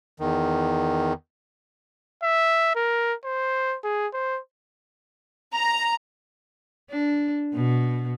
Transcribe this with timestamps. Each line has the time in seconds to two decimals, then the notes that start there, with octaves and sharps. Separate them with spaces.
0.20 E2 D#3
2.23 E5
2.76 A#4
3.24 C5
3.84 G#4
4.13 C5
5.54 A#5
6.90 D4
7.54 B2